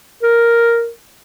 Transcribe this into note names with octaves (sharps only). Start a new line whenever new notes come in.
A#4